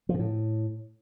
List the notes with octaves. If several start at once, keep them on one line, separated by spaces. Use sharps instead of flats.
F3
A#2
A2